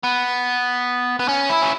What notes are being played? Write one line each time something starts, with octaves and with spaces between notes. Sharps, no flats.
B3
B3
C#4
E4
C#4